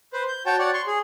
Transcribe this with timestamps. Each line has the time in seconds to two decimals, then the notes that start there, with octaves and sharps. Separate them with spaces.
0.13 B4 C5
0.28 G6
0.46 F#4 C#5 G5 A5
0.59 F#4 C#5 D5 F#5
0.74 C6 C#6
0.87 G#4